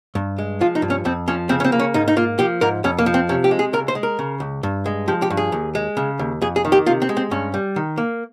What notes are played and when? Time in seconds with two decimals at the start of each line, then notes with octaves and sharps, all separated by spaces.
0.15 G2
0.38 G#3
0.61 F3 F4
0.75 D#4
0.82 G2
0.90 C#4
1.05 F2 C4
1.28 F3 C#4
1.49 C#3 C4
1.60 C#4
1.64 C4
1.72 A#3
1.79 C#4
1.94 G#2 D#4
2.08 D#4
2.17 A#3 F4
2.39 F3 G4
2.61 G#2 A#4
2.84 F2 C#4
2.98 A#3
3.06 F3
3.14 C4
3.29 C3 C#4
3.44 G4
3.51 G#3
3.59 G#4
3.73 C#2 A#4
3.88 C5
3.95 G#3
4.03 A#4
4.19 C#3
4.40 C#2
4.63 G2
4.86 G#3
5.08 F3 G4
5.22 G4
5.30 G2
5.37 G#4
5.52 D#2
5.75 G#3
5.97 C#3
6.19 D#2
6.41 F2 G#4
6.56 G#4
6.65 D#3
6.72 G4
6.86 C3 F4
7.02 C4
7.09 G#3
7.17 C4
7.31 G2 C#4
7.54 G3
7.76 D#3
7.98 A#3